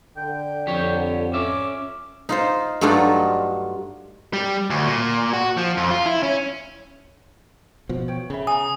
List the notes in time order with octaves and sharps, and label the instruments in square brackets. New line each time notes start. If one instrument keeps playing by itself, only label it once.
[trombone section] D3 [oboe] G5
[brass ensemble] F2 [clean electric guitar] G4 C#5
[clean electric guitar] C#4 E5 [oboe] D6
[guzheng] D#4 F4 C5
G2 F#3 A3 D4 D#4 F4
[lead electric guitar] G3
D2
A#2
F#4
F3
F2
F4
E4
C#4
[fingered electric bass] B2 F3
[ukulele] C#5 G5
[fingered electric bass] C#3 [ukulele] E5 B5
[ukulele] G#5 A#5 [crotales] D#6